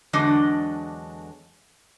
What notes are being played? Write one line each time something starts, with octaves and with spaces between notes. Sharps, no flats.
E2 D3 F#3 G#3 D4 D#5